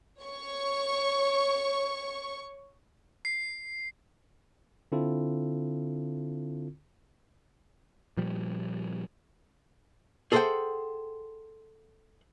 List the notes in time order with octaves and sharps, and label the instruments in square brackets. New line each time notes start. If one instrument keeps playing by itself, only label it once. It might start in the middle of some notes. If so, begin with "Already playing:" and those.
[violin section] C#5 C#6
[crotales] C7
[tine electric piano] D3 C4 E4 F4 A4
[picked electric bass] A#2 F3 G3
[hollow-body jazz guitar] G#4 A4 C5 C#5 F#5 G5